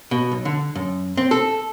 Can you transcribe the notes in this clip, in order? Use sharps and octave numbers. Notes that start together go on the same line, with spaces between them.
B2
B1
D3
F#2
C4
A4